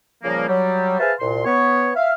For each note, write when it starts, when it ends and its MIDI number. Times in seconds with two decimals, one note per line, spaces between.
0.23 0.46 46
0.23 0.46 49
0.23 0.46 53
0.23 0.46 55
0.23 0.46 58
0.48 0.99 54
0.48 0.99 55
0.99 1.13 68
0.99 1.13 71
0.99 1.13 72
0.99 1.13 76
0.99 1.13 77
0.99 1.13 81
1.19 1.44 36
1.19 1.44 46
1.19 1.44 84
1.45 1.91 59
1.45 1.91 73
1.96 2.14 76
1.96 2.14 77